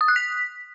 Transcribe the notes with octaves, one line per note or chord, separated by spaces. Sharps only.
D#6
F#6
B6